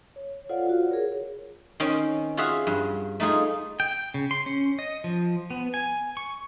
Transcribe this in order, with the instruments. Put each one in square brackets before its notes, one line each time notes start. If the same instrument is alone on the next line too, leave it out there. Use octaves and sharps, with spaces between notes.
[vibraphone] C#5
F4 A4 C5 D5 F5 F#5
F4 F#4
G#4 A#4 C#5
[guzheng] D#3 C4 C#4
F4 F#4 G#4 E5 F5
G2
A3 D#4 F4 G#4
[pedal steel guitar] G5
C#3
C6
C#4
D#5
F3
B3
G#5
C#6